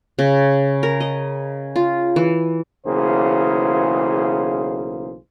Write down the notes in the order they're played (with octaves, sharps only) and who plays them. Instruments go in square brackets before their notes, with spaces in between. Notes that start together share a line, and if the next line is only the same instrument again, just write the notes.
[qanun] C#3
A#4
D#5
F4
E3
[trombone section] B1 C#3 E3 A#3 G#4 C5